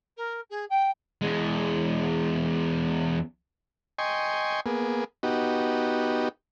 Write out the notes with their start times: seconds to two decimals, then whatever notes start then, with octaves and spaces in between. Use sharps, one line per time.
0.17 A#4
0.49 G#4
0.69 G5
1.22 E2 G#3
3.98 D#5 G5 G#5 C6 C#6
4.66 A#3 B3 G#4
5.23 B3 D#4 F#4 G4